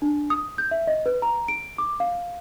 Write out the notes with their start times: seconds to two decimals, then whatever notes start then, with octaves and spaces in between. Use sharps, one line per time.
0.02 D4
0.30 D#6
0.58 G6
0.71 E5
0.87 D#5
1.06 B4
1.22 A#5
1.48 D7
1.78 D6
2.00 F5